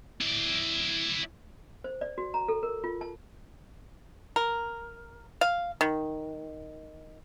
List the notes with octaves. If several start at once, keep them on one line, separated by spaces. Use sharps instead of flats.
E4 D5
C5
D5
F#4
A#5
A4
A#4
F4
A5
A#4
F5
D#3